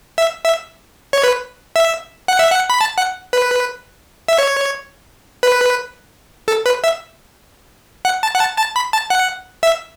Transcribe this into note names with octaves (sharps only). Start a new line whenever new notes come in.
E5
E5
C#5
B4
E5
F#5
E5
F#5
B5
A5
F#5
B4
E5
C#5
B4
A4
B4
E5
F#5
A5
F#5
A5
A5
B5
A5
F#5
E5